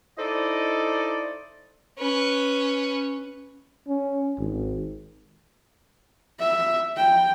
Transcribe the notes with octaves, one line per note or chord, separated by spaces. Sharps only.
D#4 E4 A4 C5 D5 D#5
C#4 B4
C#4
G#1
E5
G5